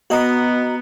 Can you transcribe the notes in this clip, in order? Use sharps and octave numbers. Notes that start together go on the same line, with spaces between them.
B3 F#4 D#5 A#5